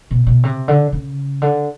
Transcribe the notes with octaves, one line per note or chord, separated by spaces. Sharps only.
B2
B2
C3
D3
C#3
D3